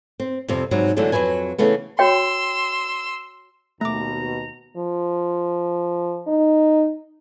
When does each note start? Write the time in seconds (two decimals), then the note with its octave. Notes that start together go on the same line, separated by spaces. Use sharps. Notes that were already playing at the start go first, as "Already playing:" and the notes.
0.20 C4
0.48 F2 C3 G3
0.71 G#2 C3 F#3 G3
0.96 D3 E3 F#3 G#3 A3 D4
1.12 F2 C3 F#3 B4 G#5
1.58 C#3 E3 A3 B3
1.99 F#4 C#5 G5 C6 E6
3.81 D#2 B2 A3 A#5 D6
4.77 F3
6.27 D#4